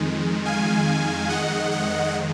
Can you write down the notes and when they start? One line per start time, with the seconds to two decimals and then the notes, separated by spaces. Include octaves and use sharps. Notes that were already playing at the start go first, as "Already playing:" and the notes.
Already playing: F2 D#3 G#3
0.45 F5 G#5
1.29 D#5 F#5
1.71 D#5 F#5